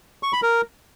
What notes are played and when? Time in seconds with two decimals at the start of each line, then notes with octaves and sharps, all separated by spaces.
0.23 C#6
0.33 B5
0.43 A#4